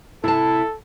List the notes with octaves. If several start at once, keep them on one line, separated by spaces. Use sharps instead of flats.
C3 E4 A4 A5